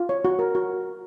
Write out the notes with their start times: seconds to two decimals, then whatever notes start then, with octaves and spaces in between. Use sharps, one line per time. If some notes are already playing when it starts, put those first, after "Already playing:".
Already playing: F4
0.09 C#5
0.25 F#4
0.39 A#4
0.55 F#4